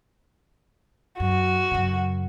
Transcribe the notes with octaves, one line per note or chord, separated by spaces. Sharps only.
F#2 F#4
F#2 C#3